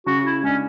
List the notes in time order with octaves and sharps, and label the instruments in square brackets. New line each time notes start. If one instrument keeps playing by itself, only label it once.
[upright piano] C#3 [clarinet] F#4
[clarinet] E4
[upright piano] G#3 D4 [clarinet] C#4